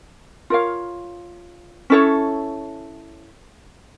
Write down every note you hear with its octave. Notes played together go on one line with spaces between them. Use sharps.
F4 A#4 C#5 F5
C#4 E4 A4 C#5